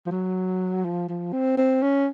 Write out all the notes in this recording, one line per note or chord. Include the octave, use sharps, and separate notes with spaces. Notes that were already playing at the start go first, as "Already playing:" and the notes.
F3
F#3
F3
F3
C4
C4
C#4